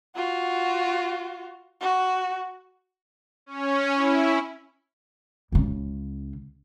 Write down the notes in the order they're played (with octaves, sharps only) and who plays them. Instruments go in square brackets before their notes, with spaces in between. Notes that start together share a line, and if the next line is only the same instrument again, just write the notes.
[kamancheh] F4 F#4
F#4
[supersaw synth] C#4
E4
[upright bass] C#2 C#3